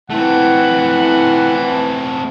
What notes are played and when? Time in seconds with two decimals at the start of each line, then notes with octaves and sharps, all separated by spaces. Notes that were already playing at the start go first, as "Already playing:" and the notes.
0.10 E3 A3 C4 E4 F#5